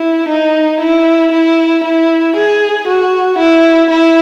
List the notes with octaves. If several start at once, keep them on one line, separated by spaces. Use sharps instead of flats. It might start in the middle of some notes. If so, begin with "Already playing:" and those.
Already playing: E4
D#4
E4
E4
E4
G#4
F#4
E4
E4